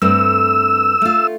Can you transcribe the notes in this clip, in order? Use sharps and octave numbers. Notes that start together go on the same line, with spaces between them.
G2 A3 C4 E6
A3 F4